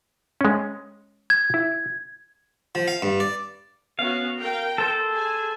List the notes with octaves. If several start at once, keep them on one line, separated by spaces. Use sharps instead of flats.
G#3 C#4
G#6
E4
F3
F5
G2
D5
B3 C#4 F#4 F5
A#4 G5
A4 C5
G#4 G#5